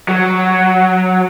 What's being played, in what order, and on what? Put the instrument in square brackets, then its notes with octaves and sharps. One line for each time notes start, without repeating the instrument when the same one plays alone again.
[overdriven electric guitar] F#3